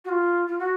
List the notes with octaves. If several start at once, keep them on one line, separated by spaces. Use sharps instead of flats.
F#4
F4
F4
F#4